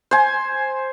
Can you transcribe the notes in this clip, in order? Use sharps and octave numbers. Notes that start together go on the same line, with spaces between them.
C5 G#5